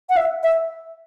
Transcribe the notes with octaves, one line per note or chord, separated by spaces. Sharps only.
F#5
E5
E5